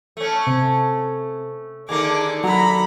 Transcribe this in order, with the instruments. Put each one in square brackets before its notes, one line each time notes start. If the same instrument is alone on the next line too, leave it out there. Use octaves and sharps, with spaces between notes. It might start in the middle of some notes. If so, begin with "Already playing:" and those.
[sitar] A3 C#4
[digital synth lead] C3
[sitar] D#2 D3 A#3 [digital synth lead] G#4 [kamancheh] D6
[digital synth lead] F#3 [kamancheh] A#5 B5